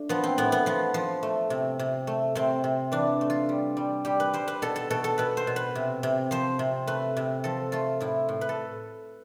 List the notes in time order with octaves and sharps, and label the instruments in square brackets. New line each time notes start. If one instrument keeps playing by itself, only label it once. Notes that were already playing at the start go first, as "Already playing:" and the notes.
Already playing: [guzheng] A3 D4
F3 B3
C4
A2 B3
B3
F3 B3
F3
A3
C3
C3
A3
C3 C4
C3
E3 D4
A3
F4
G3
G3
G3 G4
B4
G3 C5
B4
B2 A4
A4
B2 A4
A4
B2 B4
C5
B2
B4
C3
C3
F3 C5
C3
A3 B4
C3
F3 A4
A3 F4
A2 E4
A2
B4
A4